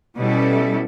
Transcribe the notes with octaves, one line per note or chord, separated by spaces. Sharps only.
B2 G3 C#4 E4 A4